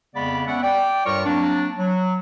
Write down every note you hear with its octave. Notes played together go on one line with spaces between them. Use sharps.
F2 C#3 G#3 B3 D5 B5
B3 C#4 D5 E5 F#5
D5 G5
G2 G3 F4 A#4 C#5 C#6
F#3 A#3 C4 D4
F#3